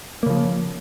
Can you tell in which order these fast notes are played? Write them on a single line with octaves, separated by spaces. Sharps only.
A#3 C#3 F3